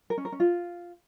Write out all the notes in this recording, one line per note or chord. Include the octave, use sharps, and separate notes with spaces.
A#4
C#4
A#4
C#4
F4